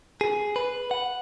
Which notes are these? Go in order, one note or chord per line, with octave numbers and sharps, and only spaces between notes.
G#4
B4
F#5